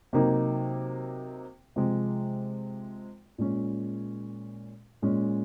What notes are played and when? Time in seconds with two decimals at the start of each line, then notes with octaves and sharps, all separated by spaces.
0.13 C3 F#3 A#3 D#4
1.76 C3 F3 G#3
3.38 A#2 G#3 C#4
5.02 A#2 G#3 C#4